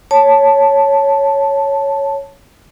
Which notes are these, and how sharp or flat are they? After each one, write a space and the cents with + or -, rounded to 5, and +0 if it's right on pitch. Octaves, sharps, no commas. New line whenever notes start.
C#5 +0 A5 -5